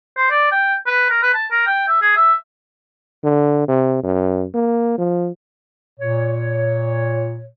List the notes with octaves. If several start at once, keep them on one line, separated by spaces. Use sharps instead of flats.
C5
D5
G5
B4
A#4
B4
A5
A#4
G5
E5
G#4
E5
D3
C3
F#2
A#3
F3
A#2 C#5